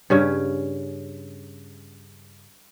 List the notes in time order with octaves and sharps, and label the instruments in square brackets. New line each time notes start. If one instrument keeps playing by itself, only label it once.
[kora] G2 C#3 C#4